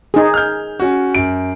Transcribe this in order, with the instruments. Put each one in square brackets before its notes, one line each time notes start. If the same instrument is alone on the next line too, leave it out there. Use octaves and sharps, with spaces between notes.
[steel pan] D#4 G#4
[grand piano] F6 G6
C#4 F#4
F#2 D7